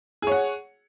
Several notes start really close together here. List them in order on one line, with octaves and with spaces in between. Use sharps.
G#4 C#5 F#5